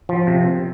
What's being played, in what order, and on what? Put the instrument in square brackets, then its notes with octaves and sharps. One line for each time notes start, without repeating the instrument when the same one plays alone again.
[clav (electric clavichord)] F3
C3